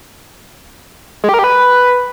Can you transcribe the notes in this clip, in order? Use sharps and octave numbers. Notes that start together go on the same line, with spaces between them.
G#3
G4
A#4
G4
B4